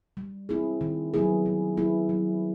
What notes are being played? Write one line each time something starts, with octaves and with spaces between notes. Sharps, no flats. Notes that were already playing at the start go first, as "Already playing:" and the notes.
G3
C4 E4 G#4
D#3
F#3 B3 E4 G#4
D#3
F#3 B3 E4 G#4
F#3